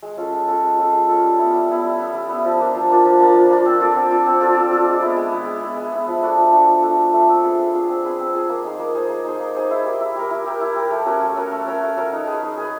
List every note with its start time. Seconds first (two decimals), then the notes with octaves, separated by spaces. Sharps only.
0.03 G#3
0.17 C#4 F4 A4
0.33 G#3
0.47 C#4 F4 A4
0.63 G#3
0.78 C#4 F4 A4
0.93 G#3
1.08 C#4 F4 A4
1.23 G3
1.39 B3 E4
1.53 G3
1.68 B3 E4
1.84 G3
1.99 B3 E4
2.14 G3
2.29 B3 E4
2.45 F3
2.59 A#3 D4 F4
2.75 F3
2.89 A#3 D4 F4
3.05 F3
3.20 A#3 D4 F4
3.35 F3
3.50 A#3 D4 F4
3.65 C4
3.80 F4 A4 D5
3.96 C4
4.11 F4 A4 D5
4.26 C4
4.41 F4 A4 D5
4.56 C4
4.71 F4 A4 D5
4.86 G#3
5.02 B3 E4
5.17 G#3
5.32 B3 E4
5.47 G#3
5.62 B3 E4
5.77 G#3
5.92 B3 E4
6.07 F3
6.22 A3 D4 F#4
6.37 F3
6.52 A3 D4 F#4
6.67 F3
6.83 A3 D4 F#4
6.98 F3
7.13 A3 D4 F#4
7.28 C4
7.43 F4 G#4 B4
7.58 C4
7.73 F4 G#4 B4
7.89 C4
8.04 F4 G#4 B4
8.19 C4
8.34 F4 G#4 B4
8.49 A#3
8.64 D#4 G#4 C5
8.79 A#3
8.94 D#4 G#4 C5
9.10 A#3
9.25 D#4 G#4 C5
9.40 A#3
9.55 D#4 G#4 C5
9.70 E4
9.85 G4 A#4
10.00 E4
10.16 G4 A#4
10.31 E4
10.46 G4 A#4
10.61 E4
10.76 G4 A#4
10.91 A3
11.06 C#4 F#4 A#4
11.22 A3
11.36 C#4 F#4 A#4
11.52 A3
11.67 C#4 F#4 A#4
11.82 A3
11.97 C#4 F#4 A#4
12.12 D#4
12.27 G#4 B4
12.42 D#4
12.58 G#4 B4